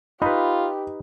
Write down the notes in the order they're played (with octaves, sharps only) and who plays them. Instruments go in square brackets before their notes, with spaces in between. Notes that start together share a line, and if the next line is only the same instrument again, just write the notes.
[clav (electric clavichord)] D#4 B4 [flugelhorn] F4 [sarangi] G4 [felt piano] B5